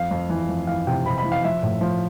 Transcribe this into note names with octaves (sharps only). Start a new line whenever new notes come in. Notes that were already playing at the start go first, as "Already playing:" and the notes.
Already playing: F2 F5
F2
E3
F2
E3 F5
C3 G5
C3 B5
B5
E3
F5
F3 E5
A2
F3